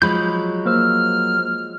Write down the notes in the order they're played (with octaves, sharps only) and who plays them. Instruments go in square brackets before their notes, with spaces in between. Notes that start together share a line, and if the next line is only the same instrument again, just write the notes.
[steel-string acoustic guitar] F3 G#3 [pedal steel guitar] F#3 B5 G6
[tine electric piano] A#3 C5 E6 [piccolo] F6